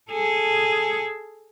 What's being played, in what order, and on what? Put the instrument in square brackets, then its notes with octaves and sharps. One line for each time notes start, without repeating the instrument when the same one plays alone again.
[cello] G#4 A4